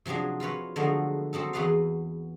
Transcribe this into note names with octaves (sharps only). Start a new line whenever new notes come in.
C3 F3 F#3 D4 G#4
F4 A#4 B4 C#5
D3 F3 F#3 G#3 A3 B3
F#3 C4 D#4 A4
E2 F#4 G#4 B4 D5 F5